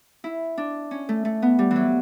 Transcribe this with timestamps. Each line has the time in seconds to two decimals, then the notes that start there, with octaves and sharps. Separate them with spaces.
0.24 E4
0.58 D4
0.91 C#4
1.09 A3
1.25 A3
1.42 B3
1.59 G3
1.71 E3
1.76 F#3